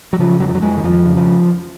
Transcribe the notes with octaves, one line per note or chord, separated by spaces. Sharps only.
F#3
C#3 F3
F2 F#3
F3
F#3
F2 G#3
D#3
F2 F3
C#3
F3